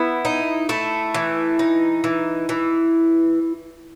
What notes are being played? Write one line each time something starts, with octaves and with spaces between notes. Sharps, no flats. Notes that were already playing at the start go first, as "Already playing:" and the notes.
Already playing: B3 E4
D#4
A3 E4
E3
D#4
E3
E3